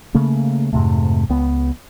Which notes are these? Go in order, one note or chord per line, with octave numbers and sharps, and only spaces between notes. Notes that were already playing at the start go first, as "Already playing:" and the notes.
C#3 A3 A#3
F2 G#2 C3 A3
C#2 B3